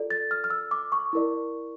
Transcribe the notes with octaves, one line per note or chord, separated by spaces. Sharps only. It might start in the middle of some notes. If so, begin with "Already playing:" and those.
Already playing: F4 A4 D5
A6
F6
F6
E6
D6
C#6
E4 A#4 D5